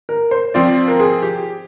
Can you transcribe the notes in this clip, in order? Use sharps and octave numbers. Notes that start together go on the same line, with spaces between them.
A#4
C5
F3 C4 F4 D5
A#4
G#4
G4